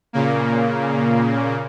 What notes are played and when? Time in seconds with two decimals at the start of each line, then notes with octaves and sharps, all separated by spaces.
0.13 A#2 C#3 A#3